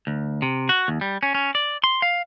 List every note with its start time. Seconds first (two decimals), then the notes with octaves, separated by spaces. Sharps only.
0.07 D2
0.42 C3
0.69 F#4
0.88 D#2
1.01 G3
1.23 C#4
1.35 C#4
1.55 D5
1.84 C6
2.02 F5